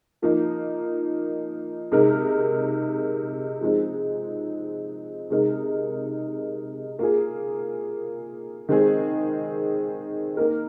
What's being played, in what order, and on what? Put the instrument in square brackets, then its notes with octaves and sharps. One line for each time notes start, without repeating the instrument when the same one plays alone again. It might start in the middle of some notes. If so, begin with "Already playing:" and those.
[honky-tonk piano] F3 A#3 D#4
C3 G#3 D#4 A#4
F3 G#3 C4 D#4
C3 G#3 D#4 A#4
A#3 F4 G#4
D#3 G#3 C4 G#4
A#3 D#4 A#4